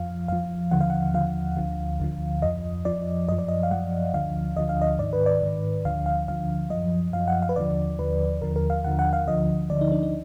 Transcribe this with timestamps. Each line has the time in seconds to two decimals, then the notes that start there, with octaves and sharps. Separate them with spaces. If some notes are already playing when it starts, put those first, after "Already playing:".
Already playing: F2 F3 F5
0.28 F2 F3 F5
0.71 D#2 D3 F3 F#5
0.81 F5
0.90 F#5
1.14 D#2 D3 F3 F5
1.57 D2 D3 F3
2.00 D2 D3 F3
2.42 F2 F3 D#5
2.85 F2 F3 D5
3.28 F#2 F3 D#5
3.39 D5
3.48 D#5
3.63 F5
3.71 F#2 F3 F#5
4.14 D2 D3 F3 F5
4.56 D2 D3 F3 D#5
4.69 F5
4.82 D#5
4.99 G#2 D#3 D5
5.13 B4
5.26 D5
5.42 G#2 D#3
5.85 D2 D3 F3 F5
6.06 F5
6.28 D2 D3 F3 F5
6.70 F#2 F3 D#5
7.13 F#2 F3 F5
7.28 F#5
7.42 F5
7.49 B4
7.56 D#2 D3 F3 D5
7.99 D#2 D3 F3 B4
8.42 D#2 D3 F3 A#4
8.56 A#4
8.70 F5
8.84 D#2 D3 F3 F#5
8.99 F#5
9.13 F5
9.27 D2 D3 F3 D#5
9.70 D2 D3 F3 D5
9.81 D#4
9.92 D4
10.03 D#4